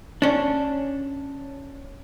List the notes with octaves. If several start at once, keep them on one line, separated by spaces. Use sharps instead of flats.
C#4 D4